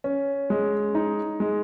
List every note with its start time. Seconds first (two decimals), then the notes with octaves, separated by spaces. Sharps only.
0.04 C#4
0.50 G#3
0.95 D#4
1.40 G#3